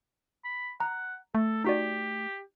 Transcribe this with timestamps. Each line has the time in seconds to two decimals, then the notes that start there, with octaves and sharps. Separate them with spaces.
0.44 B5
0.80 F#5 A#5
1.35 A3 A4
1.64 D#4 F#4 G4 D5